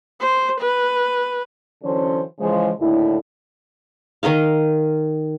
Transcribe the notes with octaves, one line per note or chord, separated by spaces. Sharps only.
C5
B4
D3 E3 F#3 C#4 A4 C5
C#3 E3 F3 G#3
D#2 A2 D3 E4
D#3 A#4 D#5 F5